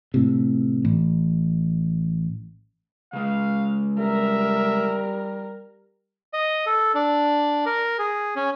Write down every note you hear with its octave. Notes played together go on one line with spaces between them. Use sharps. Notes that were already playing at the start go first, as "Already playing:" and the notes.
A2 C3
A1
C#3 G#3 F5
G3 A#4 E5
D#5
A4
D4
A#4
G#4
C#4